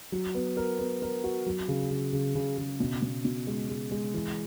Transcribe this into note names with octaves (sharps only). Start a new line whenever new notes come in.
F#3
B3
A#4
B3
A#4
F#4
F#3
C#3
C#3
C#3
C#3
C#3
B2
B2
B2
G#3
G#3
G#3
E3